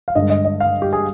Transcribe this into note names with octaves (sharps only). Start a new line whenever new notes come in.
F5
G2 D3 G#3 D#5
D#5
D#5
F5
G4
G#4